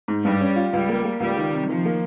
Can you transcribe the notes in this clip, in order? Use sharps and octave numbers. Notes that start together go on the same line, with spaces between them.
G#2
G2 G3
C#4
F4
C#2 G3
A#3
A#3
C#2 G3
D#3
C3
D#3 F3
A#3